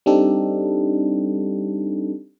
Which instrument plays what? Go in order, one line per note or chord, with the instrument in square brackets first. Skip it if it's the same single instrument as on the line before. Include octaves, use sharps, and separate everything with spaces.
[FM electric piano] G3 C4 D4 D#4 G4 A4